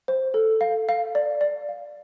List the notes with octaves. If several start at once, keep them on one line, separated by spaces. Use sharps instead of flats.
C5
A4
F5
F5
D5
D5
F5